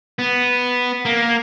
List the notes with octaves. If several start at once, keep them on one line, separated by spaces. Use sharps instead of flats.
B3
A#3